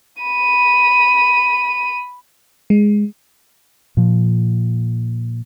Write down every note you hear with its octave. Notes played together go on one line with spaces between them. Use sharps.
B5 D#7
G#3
A#2 F3